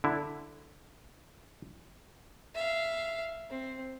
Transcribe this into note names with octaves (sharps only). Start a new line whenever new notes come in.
D3 E4
E5 F5
C4